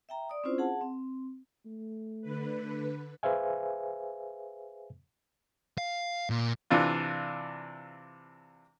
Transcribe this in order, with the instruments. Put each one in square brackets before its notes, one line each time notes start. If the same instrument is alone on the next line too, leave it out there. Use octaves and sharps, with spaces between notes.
[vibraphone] E5 G5 A#5
D5 D#6
C4 C#4 E4 F4 C5
G#4 F#5 A5
C4
[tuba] A3
[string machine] D3 B4
[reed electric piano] G#4 B4 C5 E5 F5 G#5
[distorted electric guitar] F5
A#2
[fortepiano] C3 E3 D4 F4